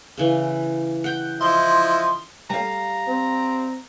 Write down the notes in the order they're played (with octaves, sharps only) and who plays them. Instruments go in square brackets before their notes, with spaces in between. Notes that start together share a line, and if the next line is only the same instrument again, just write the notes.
[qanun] C#3 E3
F#5 G5
[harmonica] F3 E4 D#5 [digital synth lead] C6
[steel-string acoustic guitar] G3 F5 [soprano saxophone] A#5
[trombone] C4